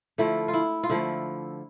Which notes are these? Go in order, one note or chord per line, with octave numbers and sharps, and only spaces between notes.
D3 F3 A3 E4
F4
E4
F4
D3 F3 A3 E4